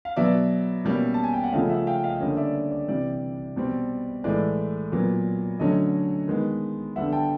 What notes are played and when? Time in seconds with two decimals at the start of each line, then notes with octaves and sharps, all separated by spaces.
0.05 F5
0.16 B2 F#3 B3 D5 E5
0.85 B2 G3 A#3 C#4
1.14 A5
1.24 G#5
1.33 G5
1.44 F#5
1.52 C#3 F3 A3 C#4 D#5 F5
1.69 E5 F#5
1.87 F5 G5
2.03 D#5 F5
2.20 D3 G3 A#3 C#4 D#5
2.37 D5 E5
2.55 D5
2.71 D5
2.88 C3 E3 G3 D5
3.56 B2 G3 C4
4.24 A2 E3 G#3 D5
4.92 A#2 F#3 B3
5.59 D3 F#3 A3 C#4 D#5
6.27 D#3 G#3 B3
6.96 D3 G3 B3 E5 F#5
7.13 G5 A5